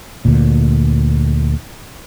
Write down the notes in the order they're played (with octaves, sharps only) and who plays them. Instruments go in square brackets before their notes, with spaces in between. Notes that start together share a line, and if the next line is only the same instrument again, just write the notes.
[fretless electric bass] D2 A#2